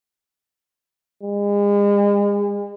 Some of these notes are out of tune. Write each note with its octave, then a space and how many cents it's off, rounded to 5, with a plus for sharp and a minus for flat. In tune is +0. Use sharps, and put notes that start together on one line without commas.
G#3 -40